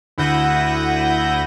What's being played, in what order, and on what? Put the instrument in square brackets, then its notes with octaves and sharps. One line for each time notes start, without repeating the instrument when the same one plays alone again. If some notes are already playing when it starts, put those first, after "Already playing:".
[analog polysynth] D2 E4 F#5 G6 A#6 D#7